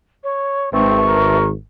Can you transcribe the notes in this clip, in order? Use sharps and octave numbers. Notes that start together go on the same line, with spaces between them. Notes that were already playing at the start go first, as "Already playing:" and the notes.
C#5
G#1 C4 B4 E5 A5 C#6
A#4